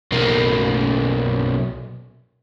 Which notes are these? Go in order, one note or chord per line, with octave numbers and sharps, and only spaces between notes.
B1 A#3